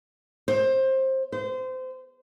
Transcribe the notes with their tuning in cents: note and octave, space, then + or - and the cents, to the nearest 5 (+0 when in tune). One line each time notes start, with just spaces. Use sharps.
C5 +20
C5 -25